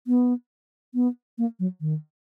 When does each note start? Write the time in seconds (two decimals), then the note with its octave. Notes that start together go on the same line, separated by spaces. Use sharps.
0.07 B3
0.94 B3
1.38 A#3
1.59 F#3
1.81 D#3